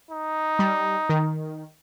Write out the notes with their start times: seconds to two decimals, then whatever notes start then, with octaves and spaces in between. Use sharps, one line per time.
0.11 D#4
0.59 G3
1.09 D#3